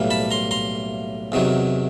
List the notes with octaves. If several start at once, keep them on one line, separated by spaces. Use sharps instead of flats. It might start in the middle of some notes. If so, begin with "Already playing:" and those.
Already playing: B1 A2 E3 G3 A#3
A5 B5
A#5 C6
A#5 C6
E2 C3 D#3 F#3